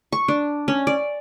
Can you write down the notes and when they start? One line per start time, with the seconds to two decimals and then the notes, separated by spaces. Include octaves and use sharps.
0.12 C#6
0.28 D4
0.68 C#4
0.87 D5